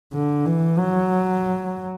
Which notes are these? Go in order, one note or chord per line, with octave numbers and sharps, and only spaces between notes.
D3
E3
F#3